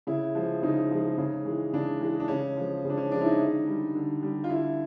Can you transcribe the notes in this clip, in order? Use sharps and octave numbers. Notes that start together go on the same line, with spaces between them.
C#3 E4
F3 G#3
C#3 D#4
F3 G#3
C#3
E3 G#3
C#3 D4
E3 G#3
D4
C#3 C#4
F3 G#3
C#3
D4
C#4
F3 G#3 D4
E4
D#4
D3
G3
D3
G3
F4
D3 E4